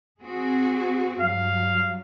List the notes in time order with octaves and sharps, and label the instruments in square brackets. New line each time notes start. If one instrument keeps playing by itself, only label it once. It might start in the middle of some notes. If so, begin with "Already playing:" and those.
[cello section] C4 F#4 G#4
[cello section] G2 F#3 [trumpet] F5